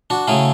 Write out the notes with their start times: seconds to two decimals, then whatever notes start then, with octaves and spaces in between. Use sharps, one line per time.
0.10 D4 F#4
0.28 C#3 F#3 A3 E4 G#4